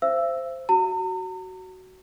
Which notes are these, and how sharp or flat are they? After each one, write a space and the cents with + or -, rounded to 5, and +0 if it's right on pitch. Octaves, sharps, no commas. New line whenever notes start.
C5 +0 E5 +45 E6 +0
F#4 +15 A#5 -40